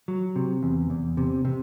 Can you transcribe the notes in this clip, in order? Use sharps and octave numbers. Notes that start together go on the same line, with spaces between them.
F#3
C3
E2
E2
C3
C3